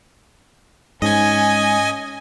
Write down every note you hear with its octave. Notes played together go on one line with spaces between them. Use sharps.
G#2 C#4 D#5 G#5